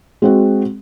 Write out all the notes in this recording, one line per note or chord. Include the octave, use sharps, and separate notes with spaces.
G#3 C4 F#4